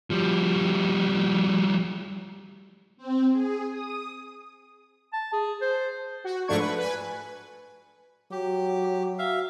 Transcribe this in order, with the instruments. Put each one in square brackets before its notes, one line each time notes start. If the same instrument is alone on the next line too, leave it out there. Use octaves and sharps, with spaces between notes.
[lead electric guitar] F3 G3
[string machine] C4
G#4
D#6
[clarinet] A5
G#4
C5
[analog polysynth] F#4
G#2 F3 A3 D4 C#6 G#6
B4
B4 G#5
[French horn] F#3 [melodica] G4
[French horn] F#4 [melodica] E5 F5